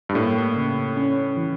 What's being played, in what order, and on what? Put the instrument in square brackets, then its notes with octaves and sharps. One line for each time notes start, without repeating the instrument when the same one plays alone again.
[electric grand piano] G2
[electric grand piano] A2 [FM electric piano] A#3
[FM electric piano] C#3
C#4
E3